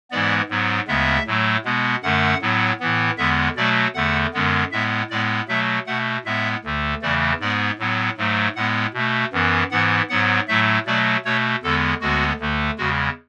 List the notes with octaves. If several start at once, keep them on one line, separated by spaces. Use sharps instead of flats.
G#2 E3 G#3 B3 D5
G#2 F#3 B3
D2 C#3 G#3 B3 E5
A2 F#3 A3
B2 G#3 B3
F#2 D3 A3 F#5
A2 F#3 B3
A2 E3 B3
E2 D3 G#3 B3 E5
B2 F#3 A3 D5
E2 D3 A3 F#5
F#2 D3 G#3 B3
A2 G#3 B3 E5
A2 G#3 B3 D5
B2 F#3 A3 E5
B2 A3 F#5
A2 G#3 B3 E5
D2 D3 A3
E2 C#3 E3 A3 D5
G#2 G#3 B3 D5
A2 F#3 B3
G#2 F#3 A3
A2 G#3 B3 F#5
B2 A3
F#2 E3 B3
G#2 E3 B3 F#5
G#2 F#3 B3 F#5
A2 F#3 A3 E5
B2 F#3 A3 D5
B2 A3 C#5
E2 D3 G#3 B3 A4
D2 D3 G#3 B3 F#4
D2 D3 A3
E2 C#3 G#3 F#4